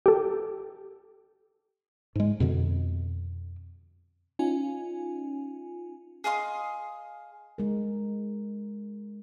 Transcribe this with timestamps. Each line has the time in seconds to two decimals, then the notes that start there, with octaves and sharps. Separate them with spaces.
0.06 G4 A4
2.15 G#2 G#3
2.40 F2 B2 D3
4.39 C#4 D#4 F4 G#5
6.24 G#4 D#5 F5 C6
7.58 G#3 A#4